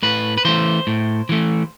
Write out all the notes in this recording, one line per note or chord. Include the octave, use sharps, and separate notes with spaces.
A2 B4
B4
E3 A3 C5
A2
E3 A3